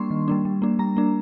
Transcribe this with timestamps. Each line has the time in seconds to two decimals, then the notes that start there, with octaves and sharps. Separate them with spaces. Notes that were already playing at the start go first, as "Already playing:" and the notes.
Already playing: G3 A#3 D4 C6 C#6
0.10 D#3
0.28 G3 A#3 D4
0.45 G3
0.62 A#3 D4
0.79 G3 A#5
0.97 A#3 D4